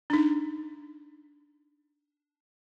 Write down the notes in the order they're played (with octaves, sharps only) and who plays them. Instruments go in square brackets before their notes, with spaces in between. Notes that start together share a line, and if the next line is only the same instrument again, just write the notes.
[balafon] D4 D#4